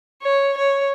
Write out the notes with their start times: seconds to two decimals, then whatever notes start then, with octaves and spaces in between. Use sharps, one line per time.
0.22 C#5
0.57 C#5